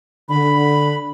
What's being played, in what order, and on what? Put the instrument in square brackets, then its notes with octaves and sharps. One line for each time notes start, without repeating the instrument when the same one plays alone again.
[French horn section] D3 [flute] B5